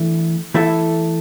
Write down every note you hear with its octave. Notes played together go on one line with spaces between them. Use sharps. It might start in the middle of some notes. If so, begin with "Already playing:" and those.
Already playing: E3 A3 D4
E3 A3 E4 A4 E5